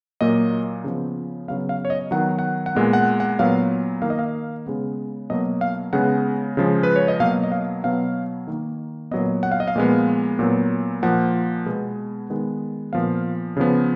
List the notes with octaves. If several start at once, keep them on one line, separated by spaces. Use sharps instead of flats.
A#2 F#3 A#3 D#5
C#3 F3 B3
C#3 F#3 B3 F5
F5
C#5
D#5
D#3 F#3 B3 F#5
F#5
F#5
A#2 G#3 B3
F#5
F#5
A#2 F#3 B3 F5
D#3 A#3 F5
D#5
F5
C#3 G#3 B3
B2 F#3 A#3 D#5
F5
C#3 G#3 B3 F#5
C#3 F3 G#3
B4
C#5
D#5
B2 F#3 A#3 F5
D#5
F5
B2 F#3 B3 F5
D#3 A#3
A#2 F#3 B3 D#5
F#5
F5
D#5
F5
A#2 F3 G#3 B3
A#2 F#3 B3
A#2 F3 A#3 F#5
B2 G#3 B3
D#3 G#3 B3
A#2 F3 B3 F5
C#3 F3 B3